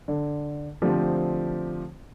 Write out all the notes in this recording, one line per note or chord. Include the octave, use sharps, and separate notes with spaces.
D3
D3 F3 A3 C4 G4